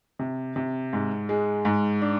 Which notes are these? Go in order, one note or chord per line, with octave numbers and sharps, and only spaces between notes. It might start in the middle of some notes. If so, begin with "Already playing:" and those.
C3
C3
G#2
G#3
G#2
D4